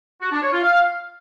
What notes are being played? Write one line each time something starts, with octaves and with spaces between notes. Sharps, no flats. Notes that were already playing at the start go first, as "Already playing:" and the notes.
F#4
D4
C#5
F4
F5